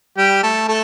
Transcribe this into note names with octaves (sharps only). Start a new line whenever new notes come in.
G3 G4
A3 A4
A3 A4